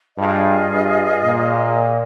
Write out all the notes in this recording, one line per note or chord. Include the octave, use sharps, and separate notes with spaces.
G2 F4 G#4 D#5
G2
A#2